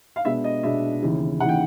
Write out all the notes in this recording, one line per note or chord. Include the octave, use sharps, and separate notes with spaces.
F5
B2 G#3 B3 D4 E5
D#5
B2 G#3 B3 D4 E5
D#2 C#3 E3
D#2 C#3 E3 F#5
G5